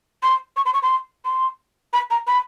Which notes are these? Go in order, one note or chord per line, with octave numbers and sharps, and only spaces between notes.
C6
C#6
C6
C#6
C6
C6
B5
A#5
B5